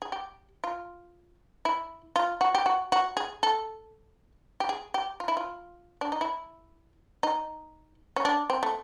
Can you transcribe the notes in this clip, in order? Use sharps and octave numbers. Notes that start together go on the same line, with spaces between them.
G#4
G4
F4
E4
F4
F#4
G4
F#4
F#4
G#4
A4
G4
G#4
G4
F4
E4
F4
D4
D#4
E4
D#4
C#4
D4
C4
A3